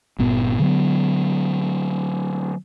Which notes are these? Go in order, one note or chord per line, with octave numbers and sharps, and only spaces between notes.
G1 A#2 B3
D3 F#3 B3